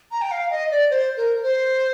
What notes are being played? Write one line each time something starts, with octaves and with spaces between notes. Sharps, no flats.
A#5
G5
F5
D#5
D5
C5
A#4
C5